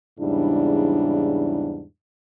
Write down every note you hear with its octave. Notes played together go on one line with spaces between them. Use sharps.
E2 G#2 C#3 G3 D4 E4